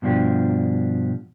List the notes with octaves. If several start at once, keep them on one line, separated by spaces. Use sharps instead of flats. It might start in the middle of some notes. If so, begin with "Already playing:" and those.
G2 B2 F3 D4 G4